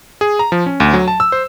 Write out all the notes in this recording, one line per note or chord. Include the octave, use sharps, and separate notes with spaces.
G#4
A#5
F3
C#4
D2
F#3
A5
E6
C5